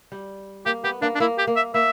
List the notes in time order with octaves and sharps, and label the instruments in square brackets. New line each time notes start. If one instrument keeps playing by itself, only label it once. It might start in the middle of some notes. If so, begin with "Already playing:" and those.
[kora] G3
[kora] A#3 [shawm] G4
[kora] B3 [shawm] G4
[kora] A#3 [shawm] D4
[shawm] D4
[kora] A#3 [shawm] E4
[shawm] G4
[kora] A#3
[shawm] E5
[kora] A#3 [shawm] E5